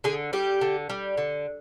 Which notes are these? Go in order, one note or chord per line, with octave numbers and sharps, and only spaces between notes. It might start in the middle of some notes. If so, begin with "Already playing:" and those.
D3 G#4
G3 G4
D3
G3
D3